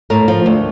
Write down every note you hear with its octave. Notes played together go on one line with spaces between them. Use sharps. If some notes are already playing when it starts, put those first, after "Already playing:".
A2 A#4
F3
D2